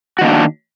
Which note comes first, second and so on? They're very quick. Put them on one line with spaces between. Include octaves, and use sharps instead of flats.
F#4 D#3 A#3 D4